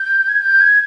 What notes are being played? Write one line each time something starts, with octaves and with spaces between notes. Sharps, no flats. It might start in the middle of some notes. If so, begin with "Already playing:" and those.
Already playing: G6
G#6
G6
G#6